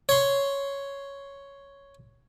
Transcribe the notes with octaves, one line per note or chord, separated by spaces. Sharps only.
C#5 C6